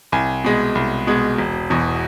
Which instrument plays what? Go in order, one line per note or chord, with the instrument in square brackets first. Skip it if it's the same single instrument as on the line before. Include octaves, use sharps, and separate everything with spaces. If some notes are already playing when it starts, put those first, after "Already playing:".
[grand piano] C2 G#5
B2 G#3
C2
B2 G#3
E1
E2 B2